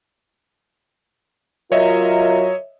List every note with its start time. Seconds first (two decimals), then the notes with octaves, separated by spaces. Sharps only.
1.72 F#3 F4 A#4 C#5 D#5 E5